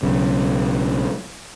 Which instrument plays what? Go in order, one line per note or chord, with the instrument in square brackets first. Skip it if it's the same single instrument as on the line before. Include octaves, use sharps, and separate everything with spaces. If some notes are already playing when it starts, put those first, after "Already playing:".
[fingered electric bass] B1 C#3